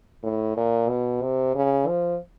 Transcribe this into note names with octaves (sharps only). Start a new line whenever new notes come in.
A2
A#2
B2
C3
C#3
F3